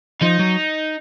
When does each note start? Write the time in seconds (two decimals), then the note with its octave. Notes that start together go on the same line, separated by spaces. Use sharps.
0.22 F3 D#4
0.39 F#3